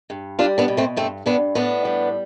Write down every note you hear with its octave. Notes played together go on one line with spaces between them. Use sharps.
G2
G3 D4 F4
B3 D4
B2
A3 C4
G2 A3 C4
G2 B3 D4
A2 B3 D4
G3